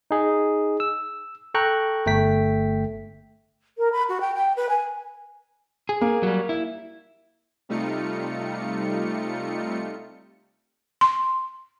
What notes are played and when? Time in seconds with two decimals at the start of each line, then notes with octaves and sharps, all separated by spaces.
0.11 D#4 G#4
0.80 E6
1.54 A4 G5 A#5 C#6 F#6
2.06 G1 A3 G5 B6
3.78 A#4
3.92 B5
4.09 F#4
4.21 G5
4.35 G5
4.57 B4
4.69 G#5
5.89 G#4
6.01 A#3
6.23 F#3 G3
6.49 E4
7.69 C3 G3 A3 D#4 F4 C#7
11.01 C6